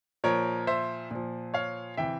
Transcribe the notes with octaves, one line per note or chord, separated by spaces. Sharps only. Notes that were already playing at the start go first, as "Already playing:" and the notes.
A#2 F3 A#4 C#5
C5 E5
A#2 F3
C#5 F5
C3 E3 E5 G5